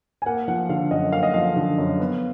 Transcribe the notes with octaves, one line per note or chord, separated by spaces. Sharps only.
G#5
A#3 F#5
F3 F#5
D3 F5
F#2 D#5
A#3 F5
D#5
F3 F5
D3
F#2
B3